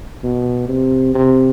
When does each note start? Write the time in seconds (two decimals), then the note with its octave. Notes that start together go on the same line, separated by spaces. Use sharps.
0.23 B2
0.68 C3
1.15 C3